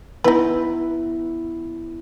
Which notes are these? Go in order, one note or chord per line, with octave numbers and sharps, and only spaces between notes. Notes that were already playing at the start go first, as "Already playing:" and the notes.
B3 D#4 E4 B4